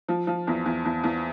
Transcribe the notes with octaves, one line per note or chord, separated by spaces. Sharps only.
F3
F3
E2
E2
E2
E2